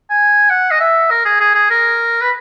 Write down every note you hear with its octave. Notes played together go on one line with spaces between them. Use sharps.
G#5
F#5
D#5
E5
A#4
G#4
G#4
G#4
A#4
B4